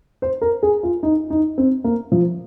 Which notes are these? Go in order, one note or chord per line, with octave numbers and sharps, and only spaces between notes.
C5
A#4
G#4
F4
D#4
D#4
C4
A#3
F3